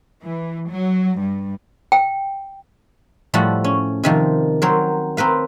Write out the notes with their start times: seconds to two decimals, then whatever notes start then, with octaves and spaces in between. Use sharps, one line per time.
0.24 E3
0.68 F#3
1.20 G2
1.92 G5
3.34 A2 F3 G3 A4 F#5
3.64 C#4
4.04 C3 D#3 F3
4.62 F#3 C4 A#4 C5
5.17 C4 A#4 B4 F5